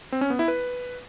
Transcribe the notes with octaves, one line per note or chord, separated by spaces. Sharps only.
C4
C#4
B3
E4
B4